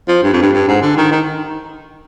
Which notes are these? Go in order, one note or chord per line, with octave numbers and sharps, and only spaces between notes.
F3
G2
F2
G2
G2
G#2
D3
D#3
D#3